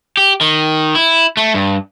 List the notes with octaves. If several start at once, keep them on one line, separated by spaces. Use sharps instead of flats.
G4
D#3
E4
A3
G2